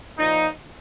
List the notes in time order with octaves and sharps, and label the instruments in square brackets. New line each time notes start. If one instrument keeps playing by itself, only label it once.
[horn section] A#2 F3 D#4